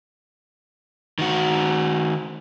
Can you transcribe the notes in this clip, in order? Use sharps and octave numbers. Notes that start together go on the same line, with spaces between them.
D#3 F#4